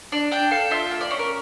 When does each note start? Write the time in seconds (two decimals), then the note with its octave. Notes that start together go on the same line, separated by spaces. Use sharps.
0.12 D4 D5
0.31 D4 G5
0.51 A4 F5
0.71 F4 E5
0.91 A#3
1.01 D5
1.11 C#4
1.19 A#4